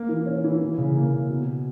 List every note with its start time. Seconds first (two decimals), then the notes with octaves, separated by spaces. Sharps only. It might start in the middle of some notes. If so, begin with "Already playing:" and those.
Already playing: A#3
0.09 E3
0.26 C#4
0.44 E3
0.62 E3
0.78 C#3
0.96 A#3
1.13 C#3
1.30 B2